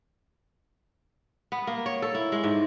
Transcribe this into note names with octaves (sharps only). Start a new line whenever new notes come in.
B3
A#3
C#5
A4
E4
G#3
G#2